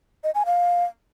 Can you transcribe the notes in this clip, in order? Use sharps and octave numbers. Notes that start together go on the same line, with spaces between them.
D#5
G#5
F5